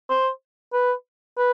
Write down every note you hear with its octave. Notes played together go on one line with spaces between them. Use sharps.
C5
B4
B4